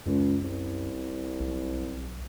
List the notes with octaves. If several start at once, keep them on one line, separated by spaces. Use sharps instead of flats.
C#2 F#2
C2
B1